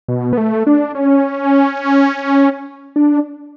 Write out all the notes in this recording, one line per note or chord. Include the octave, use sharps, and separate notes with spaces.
B2
B3
A3
D4
C#4
D4